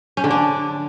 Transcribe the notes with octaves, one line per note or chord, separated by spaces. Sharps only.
C#4
D3
D4